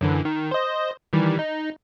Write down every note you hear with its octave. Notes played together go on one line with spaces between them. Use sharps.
F#2 D3 E3
D#3
C5 D#5
D#3 E3 G3
D#4